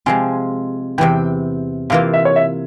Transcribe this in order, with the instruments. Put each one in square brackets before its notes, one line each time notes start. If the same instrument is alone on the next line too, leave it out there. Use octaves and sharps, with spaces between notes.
[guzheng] C3 F3 G#3 C4 F4 [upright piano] G#5
[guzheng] E2 C3 E3 [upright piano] G5
[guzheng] C3 E3 A#3 F4 [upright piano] F5
[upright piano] E5
C#5
E5